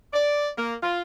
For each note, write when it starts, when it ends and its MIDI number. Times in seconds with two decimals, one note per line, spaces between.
0.14 0.48 74
0.58 0.73 58
0.83 1.01 65